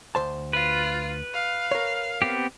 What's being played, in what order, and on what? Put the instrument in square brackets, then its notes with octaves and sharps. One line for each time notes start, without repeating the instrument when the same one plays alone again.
[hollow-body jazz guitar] D2 C5 A5
[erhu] F4 [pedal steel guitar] B4
[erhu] F5
[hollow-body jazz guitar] A#4 C#5
[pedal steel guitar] B3 C4 G4